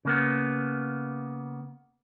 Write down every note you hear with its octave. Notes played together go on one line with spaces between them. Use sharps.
C#3 A#3 B3